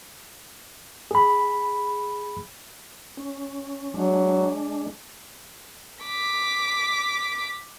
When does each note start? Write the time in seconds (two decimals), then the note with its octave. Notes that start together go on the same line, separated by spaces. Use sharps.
1.11 G#4 B5
3.17 C#4
3.94 F#3 G#3 D4
6.03 D6 B6